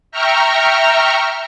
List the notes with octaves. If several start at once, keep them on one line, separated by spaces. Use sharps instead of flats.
E5 G5 A#5 C#6 F6